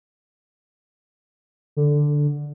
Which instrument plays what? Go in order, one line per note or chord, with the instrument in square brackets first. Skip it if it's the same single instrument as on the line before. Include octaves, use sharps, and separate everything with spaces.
[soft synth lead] D3